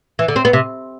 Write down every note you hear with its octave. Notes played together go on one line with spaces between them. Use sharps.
E3
D3
C4
B3
C3